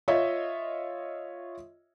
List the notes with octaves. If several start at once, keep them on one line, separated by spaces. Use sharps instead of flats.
F4 C#5 D#5 E5